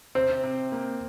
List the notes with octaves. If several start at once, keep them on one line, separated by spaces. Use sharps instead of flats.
C3 C4
C3
A#3